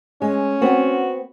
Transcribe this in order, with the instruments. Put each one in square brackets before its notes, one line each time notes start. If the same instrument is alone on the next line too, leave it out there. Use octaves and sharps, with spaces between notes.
[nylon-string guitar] G#3 [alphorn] C#4
[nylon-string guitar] B3 C4 [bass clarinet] F#4